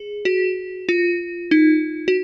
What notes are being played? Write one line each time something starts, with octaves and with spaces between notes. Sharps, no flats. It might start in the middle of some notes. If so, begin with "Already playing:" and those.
Already playing: G#4
F#4
F4
D#4
F#4